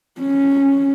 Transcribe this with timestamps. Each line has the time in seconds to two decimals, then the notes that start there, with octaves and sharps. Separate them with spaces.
0.21 C#4